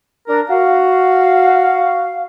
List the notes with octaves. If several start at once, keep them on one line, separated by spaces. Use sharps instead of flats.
D4 A#4
F#4 F5